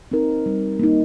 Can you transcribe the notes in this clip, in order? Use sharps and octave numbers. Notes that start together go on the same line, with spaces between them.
C4 D#4 A#4
G3
A#3 D#4